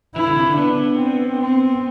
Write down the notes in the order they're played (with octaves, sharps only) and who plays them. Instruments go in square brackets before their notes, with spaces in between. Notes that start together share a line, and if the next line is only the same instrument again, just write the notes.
[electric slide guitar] E3 [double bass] E4
[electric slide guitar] D3
C3
D3
[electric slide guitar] B3 [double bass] D4
[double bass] C4
C4